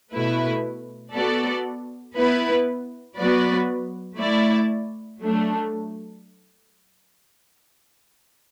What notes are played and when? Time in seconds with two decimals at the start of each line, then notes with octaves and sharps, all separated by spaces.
0.13 B2 A3 E4 B4
1.14 B3 F#4 A4 D5
2.16 B3 E4 B4
3.17 F#3 B3 F#4 B4 D5
4.19 A3 E4 D5
5.20 F#3 A3 D4